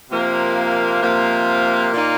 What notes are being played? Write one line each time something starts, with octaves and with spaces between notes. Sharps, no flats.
C3 F3 A#3
C3 F3 A#3
A#2 A#3 D#4